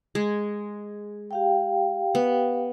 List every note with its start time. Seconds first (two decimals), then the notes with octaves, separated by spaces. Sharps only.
0.15 G#3
1.31 G4 F5 G5
2.15 B3